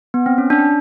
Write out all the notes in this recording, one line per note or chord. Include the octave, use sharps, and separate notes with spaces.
B3
C4
C#4
D4